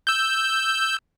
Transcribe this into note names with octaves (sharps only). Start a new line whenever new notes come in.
E6 G6